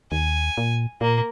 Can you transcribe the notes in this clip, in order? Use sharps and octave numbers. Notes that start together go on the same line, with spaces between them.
D#2 G#5
A#2
A#2 A#3